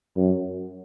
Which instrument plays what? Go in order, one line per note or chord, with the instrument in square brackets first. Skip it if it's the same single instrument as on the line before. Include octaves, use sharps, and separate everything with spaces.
[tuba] F#2